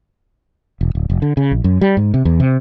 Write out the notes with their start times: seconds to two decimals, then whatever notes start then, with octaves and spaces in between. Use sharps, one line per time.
0.81 E1
0.95 D1
1.10 F1
1.22 D3
1.37 C#3
1.51 A#1
1.64 F#2
1.81 G3
1.97 G#2
2.14 C3
2.25 E2
2.40 C3